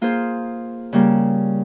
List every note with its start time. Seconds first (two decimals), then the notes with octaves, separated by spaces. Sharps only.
0.01 A#3 F4 G#4 C5
0.93 C#3 G3 A#3